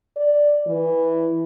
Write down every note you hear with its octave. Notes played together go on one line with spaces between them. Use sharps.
D5
E3